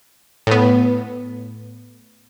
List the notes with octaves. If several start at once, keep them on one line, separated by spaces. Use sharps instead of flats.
A2 B3